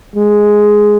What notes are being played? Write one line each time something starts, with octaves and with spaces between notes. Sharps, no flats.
G#3